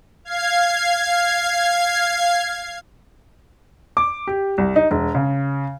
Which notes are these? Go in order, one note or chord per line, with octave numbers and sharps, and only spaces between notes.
F5 G#6 C7
D6
G4
C2
D#4
E1
C#3